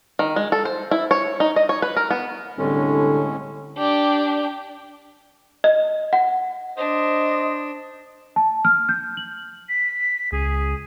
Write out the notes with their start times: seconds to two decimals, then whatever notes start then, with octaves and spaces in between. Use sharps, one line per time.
0.19 D#3
0.36 G#3
0.52 A4
0.65 C5
0.91 E4
1.11 C#5
1.40 D#4
1.56 D#5
1.69 C#5
1.82 B4
1.97 A#4
2.10 B3
2.58 C2 A2 D3 G#3 C#4 A4
3.77 D4 G4
5.64 D#5
6.13 F#5
6.78 D4 C5 D#5
8.36 A5
8.65 F6
8.89 G6
9.17 F#7
9.69 B6
10.32 C#2 G#4